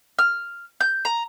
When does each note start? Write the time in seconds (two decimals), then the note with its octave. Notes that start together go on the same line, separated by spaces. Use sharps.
0.19 F6
0.81 G6
1.05 A#5